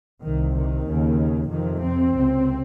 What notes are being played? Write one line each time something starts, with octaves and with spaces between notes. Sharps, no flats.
C2 C3 D#3
D#3
D#2 C#3
F2 C3 D#3
C4
C#2 C3